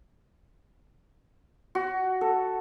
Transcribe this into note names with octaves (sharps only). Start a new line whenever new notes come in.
F#4
A4